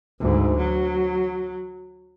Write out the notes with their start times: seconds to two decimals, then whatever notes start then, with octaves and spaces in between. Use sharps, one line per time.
0.20 D2 G#2
0.58 F#3